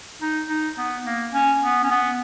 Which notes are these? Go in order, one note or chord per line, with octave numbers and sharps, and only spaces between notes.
D#4
D#4
B3
A#3
C#4
B3
C#4
B3